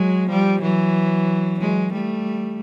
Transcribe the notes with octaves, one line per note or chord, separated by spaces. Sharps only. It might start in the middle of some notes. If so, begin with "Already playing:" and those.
Already playing: F#3 G#3
F3 G3
E3 F#3
F#3 G#3
G3 A3